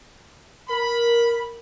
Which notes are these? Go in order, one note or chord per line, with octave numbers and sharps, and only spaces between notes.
A#4 B5